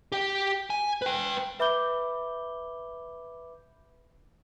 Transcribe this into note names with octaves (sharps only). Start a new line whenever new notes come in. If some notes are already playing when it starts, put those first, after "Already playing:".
G4 G5
G#5
B4 G5
B4 E5 B5 D6 G6 G7